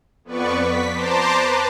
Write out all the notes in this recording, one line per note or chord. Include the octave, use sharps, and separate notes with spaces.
F2 B3 B4 D5 C#6
B6
C5 A5 A#5 C6 D6
B4